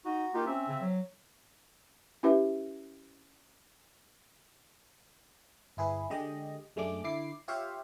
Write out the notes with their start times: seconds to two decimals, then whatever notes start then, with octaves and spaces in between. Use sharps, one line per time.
0.05 D#4 F#4
0.34 A#3 D#4 F4 G4
0.46 C4 C#4 E5
0.68 C#3
0.81 F#3
2.23 C#4 E4 G4 B4 E5
5.77 G1 E4 G#4 B4
6.10 D3 G#3 G4 D#5
6.76 F#2 G#3 A3 D4 G#4 D6
7.04 D3 E4 D6 C7
7.48 F4 G4 C#5 E5 F5